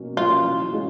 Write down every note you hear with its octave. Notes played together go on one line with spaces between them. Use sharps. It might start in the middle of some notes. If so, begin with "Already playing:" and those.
Already playing: B2 F#3 A#3 C#4
F#3 A#3 C#4 F4
E3
G#3 C#4 F#4